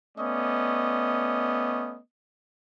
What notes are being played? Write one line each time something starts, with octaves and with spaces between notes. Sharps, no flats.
A3 B3 C#4 D5 D#5